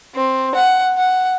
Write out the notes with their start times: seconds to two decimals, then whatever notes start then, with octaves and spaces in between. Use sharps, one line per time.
0.16 C4
0.55 F#5
0.99 F#5